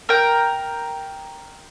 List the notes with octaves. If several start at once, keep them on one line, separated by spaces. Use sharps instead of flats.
A#4 G5